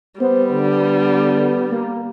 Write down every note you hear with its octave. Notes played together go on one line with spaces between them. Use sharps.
G3 B3 C5
D3
A#3